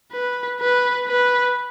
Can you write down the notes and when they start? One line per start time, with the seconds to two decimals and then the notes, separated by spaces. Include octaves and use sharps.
0.12 B4
0.60 B4
1.08 B4